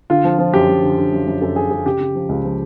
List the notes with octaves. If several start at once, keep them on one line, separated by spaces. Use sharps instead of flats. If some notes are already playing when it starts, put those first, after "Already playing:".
D3 F4
F3
F3
F#2 G4
F#2
D3
D3
F#2
F#2
F#2 A4
D3 G#4
F#2 G#4
C#3 G4
C#3
F3
C#2
F3